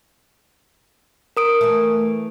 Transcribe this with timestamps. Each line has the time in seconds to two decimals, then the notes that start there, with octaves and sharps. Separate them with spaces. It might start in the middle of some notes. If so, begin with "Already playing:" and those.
1.37 A#4 D#6 D7
1.61 E3 A3